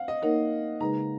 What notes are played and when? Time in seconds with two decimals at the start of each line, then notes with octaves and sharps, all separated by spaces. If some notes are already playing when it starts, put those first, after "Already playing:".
Already playing: F5 F#5
0.08 D#5
0.22 A#3 D#4 A#4 C#5 F#5
0.80 C#3 G#3 D#4 G#4 B4 A#5